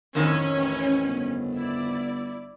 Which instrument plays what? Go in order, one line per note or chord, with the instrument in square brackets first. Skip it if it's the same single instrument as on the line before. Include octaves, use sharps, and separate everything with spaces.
[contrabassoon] D1 [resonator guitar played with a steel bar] F2 A2 D#3 [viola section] C#4
[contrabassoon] A1
G1
[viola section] E4 D5